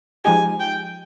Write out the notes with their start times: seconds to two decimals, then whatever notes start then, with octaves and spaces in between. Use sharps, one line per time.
0.25 F3 G#3 D#4 G4 G#5
0.60 G5